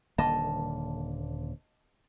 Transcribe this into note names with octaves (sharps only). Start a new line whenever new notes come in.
D#1 D3 A#3 D#5 A5